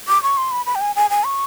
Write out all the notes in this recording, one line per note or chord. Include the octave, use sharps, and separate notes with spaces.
D6
C#6
C6
B5
B5
G5
G#5
G#5
G#5
C#6